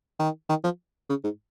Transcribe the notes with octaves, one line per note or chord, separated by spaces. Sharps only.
D#3
D#3
F3
C#3
G#2